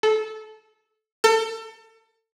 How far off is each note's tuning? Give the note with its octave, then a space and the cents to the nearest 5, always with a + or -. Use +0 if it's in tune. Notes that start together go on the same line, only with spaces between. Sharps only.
A4 -20
A4 +30